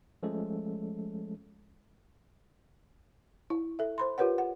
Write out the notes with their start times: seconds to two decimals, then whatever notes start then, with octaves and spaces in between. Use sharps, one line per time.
0.23 F3 G#3 A3 C#4 A4
3.50 E4
3.79 A4 E5
3.98 C5 B5 C6
4.18 F4 G4 A#4 B4 C#5 F#5
4.38 F#5